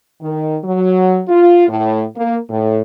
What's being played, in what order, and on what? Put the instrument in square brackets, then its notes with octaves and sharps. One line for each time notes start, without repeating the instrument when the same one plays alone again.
[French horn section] D#3
F#3
F4
A2
A#3
A2